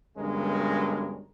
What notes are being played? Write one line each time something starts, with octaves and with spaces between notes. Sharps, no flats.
B1 G2 D3 G#3 C#4 A#4